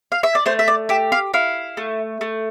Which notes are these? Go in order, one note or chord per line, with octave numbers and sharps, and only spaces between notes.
F5
E5
D5
A3 C5
E5
D5
G4 E5
F5
E4 F5
A3
A3